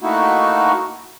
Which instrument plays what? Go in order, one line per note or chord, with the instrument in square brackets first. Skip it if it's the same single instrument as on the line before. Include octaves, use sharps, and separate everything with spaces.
[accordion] A3 A#3 D#4 E4 F#4